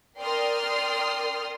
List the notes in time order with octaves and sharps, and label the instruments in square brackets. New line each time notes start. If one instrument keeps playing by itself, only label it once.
[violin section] A#4 D5 G5 C6 D#6 F6